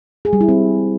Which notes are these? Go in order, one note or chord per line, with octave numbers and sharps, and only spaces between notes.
G#4
G3
E4
C4